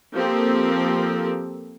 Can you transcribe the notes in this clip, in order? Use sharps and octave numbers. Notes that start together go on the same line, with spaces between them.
F3 A#3 C4 G4 A4